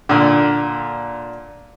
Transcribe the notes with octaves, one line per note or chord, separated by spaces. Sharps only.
A#2 D3